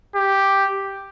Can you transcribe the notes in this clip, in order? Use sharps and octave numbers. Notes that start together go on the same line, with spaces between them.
G4